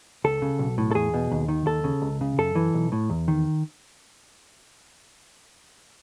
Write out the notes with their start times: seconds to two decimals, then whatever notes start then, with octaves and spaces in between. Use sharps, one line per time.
0.24 C#2 A4
0.42 C#3
0.59 B1
0.78 A2
0.91 A4
0.95 E2 G#4
1.14 B2
1.31 D#2
1.48 D#3
1.67 D#2 A4
1.84 C#3
2.02 C#2
2.21 C#3
2.38 F#2 A4
2.55 E3
2.74 B1
2.92 A2
3.10 E2
3.28 D#3